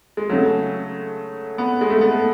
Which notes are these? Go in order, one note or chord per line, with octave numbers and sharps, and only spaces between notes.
G#3
C#3 F#3 A3
B3
G#3
A3
B3
A3